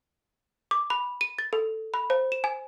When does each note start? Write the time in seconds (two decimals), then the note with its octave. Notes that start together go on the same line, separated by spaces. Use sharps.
0.71 D6
0.90 B5
1.21 D#7
1.39 A6
1.53 A4
1.94 B5
2.10 C5
2.32 E7
2.44 G#5